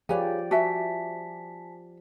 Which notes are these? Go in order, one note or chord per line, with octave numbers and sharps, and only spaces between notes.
F3 G4 G#4 B4 C#5 D5 F5 G#5
F#4 E5 G#5 A5 B6